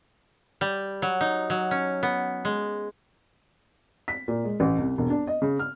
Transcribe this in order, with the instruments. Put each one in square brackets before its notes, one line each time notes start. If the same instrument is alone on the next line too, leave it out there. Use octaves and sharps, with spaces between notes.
[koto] G3
F#3
D#4
F#3
C#4
B3
G#3
[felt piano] B6
A#2
G#3
A1
C2
E1
D4
D#5
C#3
F6